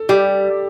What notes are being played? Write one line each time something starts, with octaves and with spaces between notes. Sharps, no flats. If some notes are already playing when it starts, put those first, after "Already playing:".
Already playing: A4
G3 G4